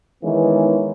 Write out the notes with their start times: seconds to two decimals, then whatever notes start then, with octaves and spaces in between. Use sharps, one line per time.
0.23 D#3 E3 G#3 B3 C#4 D#4